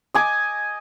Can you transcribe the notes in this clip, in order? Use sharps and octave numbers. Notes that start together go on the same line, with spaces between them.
D#5 G#5 D6